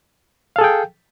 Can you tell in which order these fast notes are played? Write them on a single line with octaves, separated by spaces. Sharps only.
F5 A4 G#4 G5